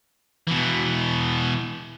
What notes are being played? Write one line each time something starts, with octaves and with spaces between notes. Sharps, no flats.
B2 E3